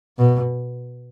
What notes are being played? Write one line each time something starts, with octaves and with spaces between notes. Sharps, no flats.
B2